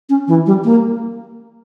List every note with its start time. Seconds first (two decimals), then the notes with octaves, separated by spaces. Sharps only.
0.09 C#4
0.28 E3
0.46 G3
0.64 A#3